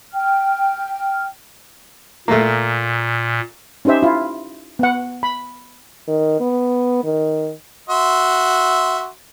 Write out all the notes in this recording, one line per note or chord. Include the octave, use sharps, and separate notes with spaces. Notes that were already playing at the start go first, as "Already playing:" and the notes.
G5 F6
A#2 A3 A#3
C#4 D#4 G4 C5 E5
E4 F4
B3 F#5
B5
D#3
B3
D#3
F#4 E5 C6